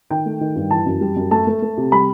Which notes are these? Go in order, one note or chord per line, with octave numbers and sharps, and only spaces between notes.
D#3 G5
A3
D#3
G2
E3 A5
F#2
G3
F#2
A3 A5
A3
A3
C3
G3 B5